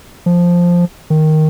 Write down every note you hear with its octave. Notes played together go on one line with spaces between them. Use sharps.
F3
D#3